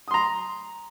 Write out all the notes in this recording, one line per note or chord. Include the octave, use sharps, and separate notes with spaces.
A#5 C6 D#6